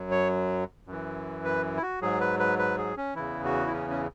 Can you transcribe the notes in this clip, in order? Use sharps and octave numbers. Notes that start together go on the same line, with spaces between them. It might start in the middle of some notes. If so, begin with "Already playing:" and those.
Already playing: F#2 F#3
C#5
F#2 E3
B4
E4
F#4
G#2 F#3 G#4
B4
B4
B4
G#4
C#4
E2 C#3 E3 E4
F#4
E4
C#4
C#4